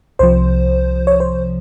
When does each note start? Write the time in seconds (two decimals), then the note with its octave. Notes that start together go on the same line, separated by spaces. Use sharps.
0.19 C2 C3 F3 C5
1.07 C#5
1.20 C5